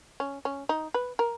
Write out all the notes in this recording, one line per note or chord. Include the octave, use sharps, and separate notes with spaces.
C#4
C#4
D#4
B4
A#4